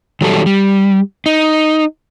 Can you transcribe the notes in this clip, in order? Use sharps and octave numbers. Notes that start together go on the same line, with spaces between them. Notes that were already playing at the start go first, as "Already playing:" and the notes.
D#3 F#3 G3 A4
G3
D#4